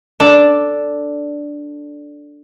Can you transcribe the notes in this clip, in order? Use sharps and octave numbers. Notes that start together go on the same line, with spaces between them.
D4 A4 D5 E7